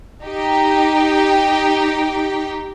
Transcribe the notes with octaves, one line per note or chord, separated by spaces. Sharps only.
D#4 G4 G5